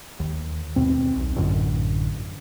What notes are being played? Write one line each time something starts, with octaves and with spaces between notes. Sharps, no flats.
D#2
D#2 B2 C4
B1
A1 F#2 D3